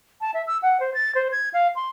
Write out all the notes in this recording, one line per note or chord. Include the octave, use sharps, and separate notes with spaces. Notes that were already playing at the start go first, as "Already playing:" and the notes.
A5
E5
E6
F#5
C5
A6
C5
G#6
F5
C6